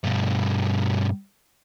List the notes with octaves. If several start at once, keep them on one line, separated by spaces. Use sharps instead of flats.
G2 B2